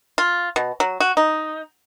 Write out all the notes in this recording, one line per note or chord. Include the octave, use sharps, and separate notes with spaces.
F4
B2
F#3
F#4
D#4